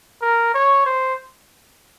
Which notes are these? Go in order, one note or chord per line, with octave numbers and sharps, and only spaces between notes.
A#4
C#5
C5